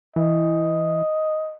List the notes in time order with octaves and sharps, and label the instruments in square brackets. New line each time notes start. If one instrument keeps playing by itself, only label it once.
[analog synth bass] E3 [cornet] D#5